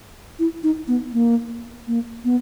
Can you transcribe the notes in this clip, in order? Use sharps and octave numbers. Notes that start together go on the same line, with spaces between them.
E4
D#4
B3
A#3
A#3
B3